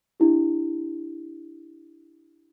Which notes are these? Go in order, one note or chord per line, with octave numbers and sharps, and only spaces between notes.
D4 E4 G4